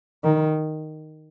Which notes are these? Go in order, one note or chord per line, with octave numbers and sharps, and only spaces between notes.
D#3